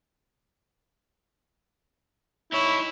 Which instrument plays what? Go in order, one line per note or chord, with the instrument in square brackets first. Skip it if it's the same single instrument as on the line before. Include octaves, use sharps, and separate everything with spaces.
[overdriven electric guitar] D#4 C#5 [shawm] E4